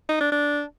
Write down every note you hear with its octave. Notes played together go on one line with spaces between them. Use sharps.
D#4
D4
D4